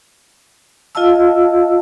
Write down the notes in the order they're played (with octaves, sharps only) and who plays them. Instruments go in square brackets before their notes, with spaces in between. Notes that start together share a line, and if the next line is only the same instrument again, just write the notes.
[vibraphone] F4 D#5 F5 A5 E6